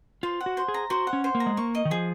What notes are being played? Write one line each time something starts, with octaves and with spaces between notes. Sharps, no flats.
F4 C5
F#5
F#4
C5
G#4
A#5
F#4 C5
F#5
C#4
C5
A#3
A#5
G#3
A#3 C#6
D#5
D#3
F3 G#4